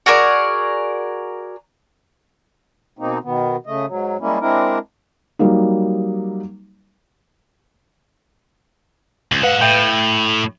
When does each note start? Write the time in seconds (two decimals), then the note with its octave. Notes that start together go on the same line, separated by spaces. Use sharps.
0.06 F#4 G#4 A#4 D5
2.99 B2 A#3 C4 D#4
3.24 B2 D#3 B3
3.66 C#3 A3 D#5
3.87 G#2 F#3
4.20 G3 G#3 A#3 C#4 E4
4.40 G#3 C4 D4 E4 A#4
5.39 F#3 G3 A#3 D#4
9.32 C#2
9.43 G#3 B4 F5 F#5
9.61 A2 E5 G5 G6